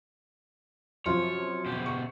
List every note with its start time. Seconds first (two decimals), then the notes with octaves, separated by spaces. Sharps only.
1.06 F#2 C3 F3 F4 C#5
1.66 B2 G4
1.86 C#6